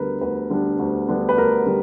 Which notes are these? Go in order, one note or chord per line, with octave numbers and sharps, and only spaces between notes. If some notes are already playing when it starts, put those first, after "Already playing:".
Already playing: D2 D3 G3 B3 D4 A#4 B4
D2 B4
D3 G3 B3 D4
D2
D3 G3 B3 D4
B4
D2 A#4
D3 G3